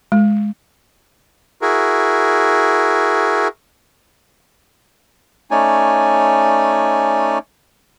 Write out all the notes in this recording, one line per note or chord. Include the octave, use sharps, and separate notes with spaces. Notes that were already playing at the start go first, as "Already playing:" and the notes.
G#3
E4 F#4 G#4 A#4
A3 C#4 D#4 C#5 D5 G#5